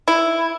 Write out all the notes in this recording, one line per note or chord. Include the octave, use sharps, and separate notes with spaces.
E4